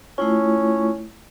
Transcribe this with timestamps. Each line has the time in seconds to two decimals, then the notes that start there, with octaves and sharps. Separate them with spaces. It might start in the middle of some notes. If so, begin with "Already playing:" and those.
0.18 A3 C#4 E4 F4